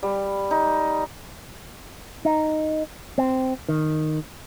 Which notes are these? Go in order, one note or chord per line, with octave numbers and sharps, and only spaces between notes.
G3
D#4
D#4
C4
D#3